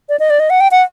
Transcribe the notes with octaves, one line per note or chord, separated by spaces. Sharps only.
D5
D#5
D5
D#5
F#5
G5
F#5